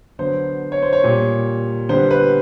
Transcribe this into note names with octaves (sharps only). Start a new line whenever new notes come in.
D3 F#3 B3 C5
C#5
C5
C#5
A#2 G3 A#3
D3 G3 B3 C5
B4